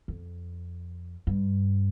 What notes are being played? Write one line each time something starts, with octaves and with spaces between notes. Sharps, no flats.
F2
G2